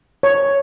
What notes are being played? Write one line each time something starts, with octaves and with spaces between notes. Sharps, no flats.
C#5